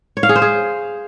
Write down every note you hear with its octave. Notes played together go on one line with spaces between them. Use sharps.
C#5
F5
G#4
C5
G#4